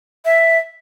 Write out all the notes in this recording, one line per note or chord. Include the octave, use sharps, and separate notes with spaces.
E5